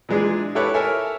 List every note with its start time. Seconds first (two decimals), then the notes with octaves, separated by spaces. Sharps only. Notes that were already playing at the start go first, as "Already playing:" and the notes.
0.09 A#2 E3 G#3 D4 G#4
0.55 E4 G4 A4 B4 C#5
0.74 A4 A#4 C#5 E5 G#5